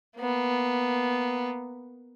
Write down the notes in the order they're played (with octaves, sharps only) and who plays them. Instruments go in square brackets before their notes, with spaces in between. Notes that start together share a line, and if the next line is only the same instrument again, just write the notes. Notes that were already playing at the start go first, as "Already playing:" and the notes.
[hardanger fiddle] A#3 B3